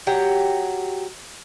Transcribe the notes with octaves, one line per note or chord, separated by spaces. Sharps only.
F#3 G4 F#5 G5